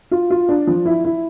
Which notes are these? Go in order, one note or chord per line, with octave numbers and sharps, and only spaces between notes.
F4
F4
D4
F3
E4
E4